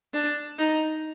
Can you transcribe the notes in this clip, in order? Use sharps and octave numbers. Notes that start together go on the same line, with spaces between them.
D4
D#4